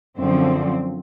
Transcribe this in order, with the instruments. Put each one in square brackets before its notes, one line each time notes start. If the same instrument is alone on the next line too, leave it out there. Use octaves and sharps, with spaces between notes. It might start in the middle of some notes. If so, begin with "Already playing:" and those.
[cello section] F#2 D3 F3 C4